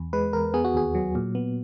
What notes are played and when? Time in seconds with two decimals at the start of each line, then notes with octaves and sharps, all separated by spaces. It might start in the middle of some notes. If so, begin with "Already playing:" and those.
Already playing: E2
0.13 G#3 B4
0.33 E2 A#4
0.54 B3 G#4
0.65 F#4
0.74 D#2 G#4
0.95 F#3
1.15 A#2
1.35 B3